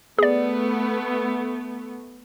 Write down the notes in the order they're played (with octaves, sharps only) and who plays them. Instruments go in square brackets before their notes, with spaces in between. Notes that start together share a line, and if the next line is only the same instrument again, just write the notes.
[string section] A3 B3 [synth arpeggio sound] G#4 D5